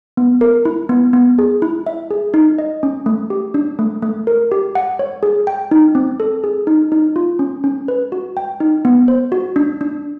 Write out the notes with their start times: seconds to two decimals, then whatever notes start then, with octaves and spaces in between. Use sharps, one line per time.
0.17 B3
0.41 A#4
0.65 E4
0.89 B3
1.13 B3
1.39 G#4
1.62 E4
1.86 E5
2.11 G#4
2.34 D#4
2.58 D#5
2.83 C#4
3.06 A3
3.30 G4
3.54 D4
3.79 A3
4.02 A3
4.27 A#4
4.52 G4
4.75 F#5
4.99 C#5
5.23 G#4
5.47 G5
5.71 D#4
5.95 C4
6.20 A4
6.44 G#4
6.67 D#4
6.92 D#4
7.16 F4
7.39 C#4
7.64 C#4
7.88 B4
8.12 F#4
8.37 G5
8.60 D#4
8.85 B3
9.08 C5
9.32 F#4
9.56 D4
9.81 D4